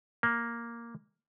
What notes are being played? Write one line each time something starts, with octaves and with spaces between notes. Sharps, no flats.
A#3